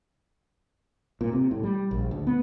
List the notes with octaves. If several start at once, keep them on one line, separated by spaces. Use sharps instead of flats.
A#2
C3
A2
G3
A#1
D2
B3